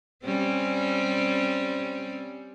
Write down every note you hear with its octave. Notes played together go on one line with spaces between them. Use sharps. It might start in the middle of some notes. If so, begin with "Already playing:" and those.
G3 C4 C#4